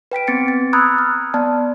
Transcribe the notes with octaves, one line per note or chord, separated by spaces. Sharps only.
B4 G5 B6 D7
B3 C4 A6 C#7
A6
A#5 B5 D#6 E6 F#6 G#6
F6
B3 D5 A5